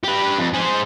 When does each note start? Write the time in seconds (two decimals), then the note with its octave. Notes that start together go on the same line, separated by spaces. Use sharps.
0.04 G4 B4
0.38 F2
0.54 G#4 C5